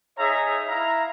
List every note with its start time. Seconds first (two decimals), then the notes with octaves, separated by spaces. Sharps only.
0.18 D#4 G#4 C#5 D#5 E5 A#5
0.68 E4 E5 F5 A#5